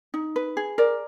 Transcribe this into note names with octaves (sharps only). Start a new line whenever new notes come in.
D#4
B4
G#4
A#4 D5